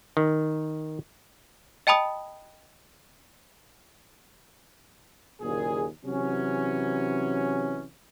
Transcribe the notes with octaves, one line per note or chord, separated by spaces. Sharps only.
D#3
D#5 G5 A5 B5 D#6
F#1 D#2 A#2 G#4
C3 E3 F#3 C#4